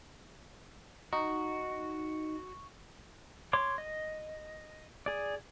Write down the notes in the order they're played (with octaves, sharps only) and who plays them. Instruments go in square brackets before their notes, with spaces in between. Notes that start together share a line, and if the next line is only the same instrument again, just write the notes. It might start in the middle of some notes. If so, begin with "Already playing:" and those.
[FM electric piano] D#4 [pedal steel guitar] F#4 [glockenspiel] C#6
[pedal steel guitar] C#5 C6 D6
D#5
G#4 D5